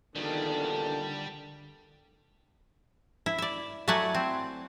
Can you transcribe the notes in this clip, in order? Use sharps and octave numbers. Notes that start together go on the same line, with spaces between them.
E2 A#2 D3 D#3 G3 D4 G4 A4
E4
D5 E5
F#3 A3 E4 D5 F#5 G#5
C4